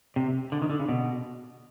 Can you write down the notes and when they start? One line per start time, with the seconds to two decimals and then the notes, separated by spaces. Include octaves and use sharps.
0.16 C3
0.52 D3
0.62 D#3
0.70 D3
0.80 C#3
0.89 B2